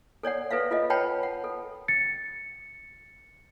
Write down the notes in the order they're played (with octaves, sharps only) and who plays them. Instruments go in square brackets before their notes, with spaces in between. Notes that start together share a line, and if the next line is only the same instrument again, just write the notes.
[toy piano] A4 C#5 D5 F#5
A4 B4 E5 F5
F4 A4 D#5
B4 C#5 F#5 G5 A5 B5
F#5
A4
[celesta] A6 C#7